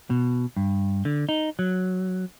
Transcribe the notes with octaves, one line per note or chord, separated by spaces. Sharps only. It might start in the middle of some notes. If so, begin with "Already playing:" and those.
B2
G2
D3
D#4
F#3